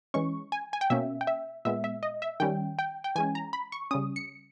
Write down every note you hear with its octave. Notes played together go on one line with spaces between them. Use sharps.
E3 G#3 C#4 C#6
G#5
G#5
G5
B2 A#3 C#4 E5
G5
E5
A#2 G#3 B3 E5
E5
D#5
E5
D#3 G3 C#4 G5
G5
G5
E3 G#3 C#4 G#5
A#5
B5
C#6
C#3 G3 C#4 D#6
C#7